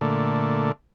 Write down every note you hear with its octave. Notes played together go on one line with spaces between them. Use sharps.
A#2 D3 A3